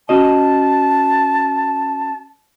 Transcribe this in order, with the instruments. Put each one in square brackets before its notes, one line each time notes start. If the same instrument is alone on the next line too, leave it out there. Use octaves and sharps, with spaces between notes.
[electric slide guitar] C#4 F#4 D#5 [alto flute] A5